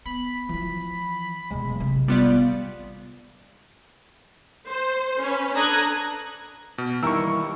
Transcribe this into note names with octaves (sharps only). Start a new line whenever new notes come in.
B3 B5
E3 F3
D1 B2 G#3
A1 C3
G3 B3 F4 D5
C5
C#4 B4
D4 A4 A#5 D#6 F#6 G#6
B2
D#2 E3 G3 E4 A#4 C#6 E6